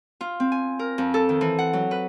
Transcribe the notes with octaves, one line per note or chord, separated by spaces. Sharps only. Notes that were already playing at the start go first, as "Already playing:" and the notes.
F4
C4
G#5
A#4
F2
A4
D#3
E3
F#5
F#3
B4